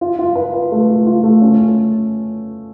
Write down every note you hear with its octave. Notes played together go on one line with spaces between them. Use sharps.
F4
F4
B4
B4
A3
F4
F4
A3
C#4